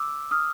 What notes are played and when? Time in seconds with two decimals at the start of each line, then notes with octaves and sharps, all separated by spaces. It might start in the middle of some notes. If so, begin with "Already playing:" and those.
Already playing: D6 E6
0.31 D#6 F6